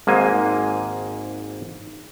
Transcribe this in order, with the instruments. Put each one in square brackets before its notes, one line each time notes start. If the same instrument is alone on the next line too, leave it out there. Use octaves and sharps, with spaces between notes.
[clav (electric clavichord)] G#1 G#2 A#3 G#5